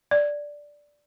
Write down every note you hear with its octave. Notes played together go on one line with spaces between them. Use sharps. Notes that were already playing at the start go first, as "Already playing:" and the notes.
D5